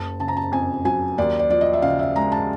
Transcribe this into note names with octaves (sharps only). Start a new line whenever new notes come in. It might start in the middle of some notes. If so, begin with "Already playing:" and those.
Already playing: F#1 A5
C#3 A5
A#5
A5
F2 G#5
F#3 G#5
D#2 D5
D5
F3 D5
D#5
E5
C#3 F5
E5
G#3 A#5
A5